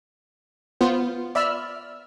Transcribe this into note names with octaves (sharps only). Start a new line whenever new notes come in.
B3 F4 C5
D5 E5 B5 E6 F6